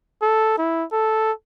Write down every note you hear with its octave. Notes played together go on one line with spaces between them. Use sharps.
A4
E4
A4